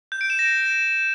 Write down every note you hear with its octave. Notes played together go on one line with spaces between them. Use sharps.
G6
D7
E7
A#6